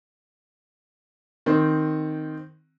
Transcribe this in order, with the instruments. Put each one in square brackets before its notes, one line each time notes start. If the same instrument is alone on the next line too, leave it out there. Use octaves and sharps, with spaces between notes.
[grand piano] D#3 C4